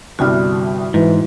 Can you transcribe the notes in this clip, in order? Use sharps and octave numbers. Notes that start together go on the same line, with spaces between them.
G1 C2 G3 F#4 F6
G#2 E3